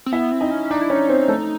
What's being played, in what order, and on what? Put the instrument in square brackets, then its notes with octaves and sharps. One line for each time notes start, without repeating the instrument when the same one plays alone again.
[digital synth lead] C4
[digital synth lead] B3 [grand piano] E4 E5
[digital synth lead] C4
[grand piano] D#4 D#5
[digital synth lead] C#4
[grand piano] D4 D5 [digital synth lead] D#4
[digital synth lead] E4
[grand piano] C#4 C#5 [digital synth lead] D#4
[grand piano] C4 C5
A3 A4